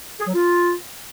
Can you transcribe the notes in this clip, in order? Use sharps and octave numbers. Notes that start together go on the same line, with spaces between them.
G#4
F#3
F4